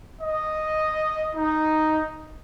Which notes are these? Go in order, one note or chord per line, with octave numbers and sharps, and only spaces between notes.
D#5
D#4